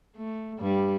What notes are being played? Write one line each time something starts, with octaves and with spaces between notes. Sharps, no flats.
A3
G2 G3